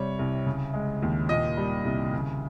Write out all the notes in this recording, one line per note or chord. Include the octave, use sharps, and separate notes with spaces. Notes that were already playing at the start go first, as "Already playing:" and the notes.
Already playing: C3 G3 C#5
C2
C#3
G#3
D#2
A#2 D#5
G3
C2
C#3